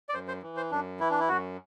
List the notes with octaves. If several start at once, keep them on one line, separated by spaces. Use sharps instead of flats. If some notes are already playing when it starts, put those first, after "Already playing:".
D5
F#2 C5
C5
E3
C5
F#2 D4
E3 E4
D4
E4
F#2 F#4